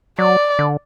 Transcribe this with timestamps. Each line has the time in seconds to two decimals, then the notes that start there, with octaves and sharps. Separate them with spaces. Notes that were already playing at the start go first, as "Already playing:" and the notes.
0.19 F#3 D5
0.59 D3